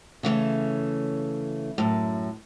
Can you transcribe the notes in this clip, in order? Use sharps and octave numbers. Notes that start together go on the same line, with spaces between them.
C#3 E3 A3 C#4
F#2 A2